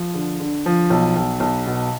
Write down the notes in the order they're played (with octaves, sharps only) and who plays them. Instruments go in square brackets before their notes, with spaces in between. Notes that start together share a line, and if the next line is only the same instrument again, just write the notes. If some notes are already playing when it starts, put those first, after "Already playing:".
Already playing: [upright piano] F3
D3
D3
F3
B1
B1
B1
B2